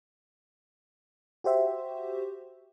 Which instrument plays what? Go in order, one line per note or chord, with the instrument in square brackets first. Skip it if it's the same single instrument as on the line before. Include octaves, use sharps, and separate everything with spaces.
[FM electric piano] F#4 G4 C5 E5